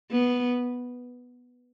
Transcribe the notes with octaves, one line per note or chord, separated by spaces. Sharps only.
B3